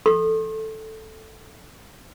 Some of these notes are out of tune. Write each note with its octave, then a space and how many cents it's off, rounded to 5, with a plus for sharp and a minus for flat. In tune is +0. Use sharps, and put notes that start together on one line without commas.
A4 +0 C6 +40